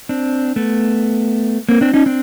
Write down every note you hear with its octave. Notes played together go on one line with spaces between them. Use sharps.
C4 D4
A3 B3
A#3 C4
C4 D4
C#4 D#4
C4 D4